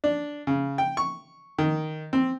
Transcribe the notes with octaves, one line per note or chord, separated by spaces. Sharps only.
D4
C#3
G5
C#6
D#3
C4